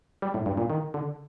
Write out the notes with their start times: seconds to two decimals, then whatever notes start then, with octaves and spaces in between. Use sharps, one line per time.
0.22 G3
0.34 A2
0.46 G2
0.58 A#2
0.70 D#3
0.94 D3